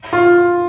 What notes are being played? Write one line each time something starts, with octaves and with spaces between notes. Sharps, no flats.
F4